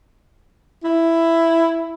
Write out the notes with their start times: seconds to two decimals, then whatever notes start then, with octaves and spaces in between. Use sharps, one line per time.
0.84 E4